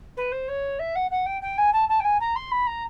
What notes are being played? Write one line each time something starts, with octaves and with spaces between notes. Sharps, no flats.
B4
C5
C#5
E5
F#5
F#5
G5
G5
G#5
A5
A5
G5
G#5
A#5
C6
B5
A#5